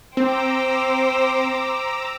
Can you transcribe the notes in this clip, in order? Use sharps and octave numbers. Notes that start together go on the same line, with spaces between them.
C4 C5 G5 A#5 D6 E6